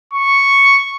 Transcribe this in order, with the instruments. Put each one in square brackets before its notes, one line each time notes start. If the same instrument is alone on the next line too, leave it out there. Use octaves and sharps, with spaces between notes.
[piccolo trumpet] C#6